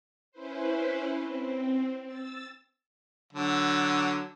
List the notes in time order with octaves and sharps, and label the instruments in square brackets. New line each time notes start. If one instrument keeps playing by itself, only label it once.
[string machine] C#4 E4 B4 C5
C4
E6 A6
[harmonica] D3 F#3